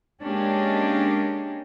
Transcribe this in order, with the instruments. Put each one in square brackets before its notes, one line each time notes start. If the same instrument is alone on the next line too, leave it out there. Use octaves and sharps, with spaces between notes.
[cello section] G#3 A#3 C#4 D4 G4